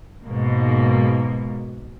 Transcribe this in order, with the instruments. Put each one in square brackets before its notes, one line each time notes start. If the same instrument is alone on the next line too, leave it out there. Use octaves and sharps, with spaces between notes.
[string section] G#2 B2 A#3